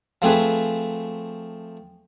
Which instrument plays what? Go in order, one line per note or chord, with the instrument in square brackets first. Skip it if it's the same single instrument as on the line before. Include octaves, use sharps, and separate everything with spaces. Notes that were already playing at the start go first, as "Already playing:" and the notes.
[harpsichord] F3 A3 C4 G#4 B4